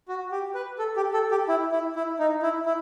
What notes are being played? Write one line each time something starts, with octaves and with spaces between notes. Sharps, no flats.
F#4
G4
B4
A4
G4
A4
G4
E4
E4
E4
D#4
E4
E4